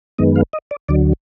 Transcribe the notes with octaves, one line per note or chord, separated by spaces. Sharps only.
F#2 D#3 G#3 B3 D#5
F5
D#5
D5
D2 D3 F#3 D5